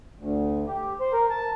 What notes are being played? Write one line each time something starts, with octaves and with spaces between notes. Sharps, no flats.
D2
G4
C5
A#4
A5